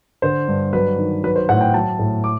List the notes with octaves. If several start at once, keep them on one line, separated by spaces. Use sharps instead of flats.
D3 C5
G2
F#3 B4
D#3
F#3 B4
C5
A2 F#5
G5
F#3 A5
A2
D6